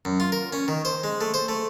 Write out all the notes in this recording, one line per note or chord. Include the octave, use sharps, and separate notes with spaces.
F#2
F4
A#4
C#4
D#3
C5
G#3
A3
C5
A3